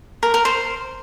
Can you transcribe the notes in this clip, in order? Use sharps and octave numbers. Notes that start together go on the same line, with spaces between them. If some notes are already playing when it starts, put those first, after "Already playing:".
A#4
A#4
C5